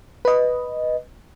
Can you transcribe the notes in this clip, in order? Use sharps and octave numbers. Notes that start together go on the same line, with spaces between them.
B4 D#5